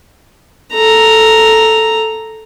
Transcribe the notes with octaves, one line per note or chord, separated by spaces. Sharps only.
A4 A#5